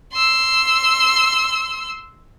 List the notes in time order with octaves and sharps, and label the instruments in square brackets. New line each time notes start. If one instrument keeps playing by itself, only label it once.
[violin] C6 E6